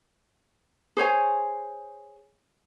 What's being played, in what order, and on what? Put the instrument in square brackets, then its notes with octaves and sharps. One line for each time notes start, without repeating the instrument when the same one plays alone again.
[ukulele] G#4 C5 C#5 G#5